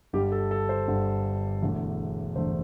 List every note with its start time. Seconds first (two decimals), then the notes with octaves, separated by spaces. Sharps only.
0.13 G1 G2 D3 G3 G4
0.32 A4
0.51 A4
0.69 C5
0.88 G1 G2 D3 G3
1.62 E1 E2 D3 A3
2.36 E1 E2 D3 A3 C5